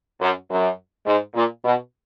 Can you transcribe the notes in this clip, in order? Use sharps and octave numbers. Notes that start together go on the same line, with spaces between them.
F#2
F#2
G#2
A#2
B2